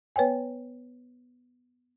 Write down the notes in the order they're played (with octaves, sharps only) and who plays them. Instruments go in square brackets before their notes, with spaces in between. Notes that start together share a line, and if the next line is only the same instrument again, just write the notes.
[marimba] B3 B4 C#5 G5 G#5